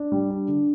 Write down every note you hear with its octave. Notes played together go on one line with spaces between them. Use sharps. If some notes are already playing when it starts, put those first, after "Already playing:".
Already playing: D4
G3
D4
D3